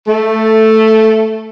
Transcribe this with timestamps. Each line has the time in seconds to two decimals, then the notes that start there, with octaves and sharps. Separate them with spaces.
0.07 A3